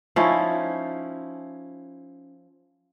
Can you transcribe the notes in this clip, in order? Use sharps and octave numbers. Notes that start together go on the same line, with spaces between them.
F3 C#4 D#4 E4